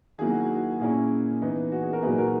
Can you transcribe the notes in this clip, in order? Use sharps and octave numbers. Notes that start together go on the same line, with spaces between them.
D#3 F#3 A#3 E4 G#4
F#4
F#4
A#2 A#3 C#4 E4 G#4
E3 B3 D#4
F#4
G#4
F#4 A#4
A#2 F#3 A#3 D#4 G#4 B4
F#4 A#4